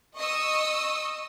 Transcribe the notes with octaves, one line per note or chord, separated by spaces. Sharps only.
D#5 C#6 D#6 E6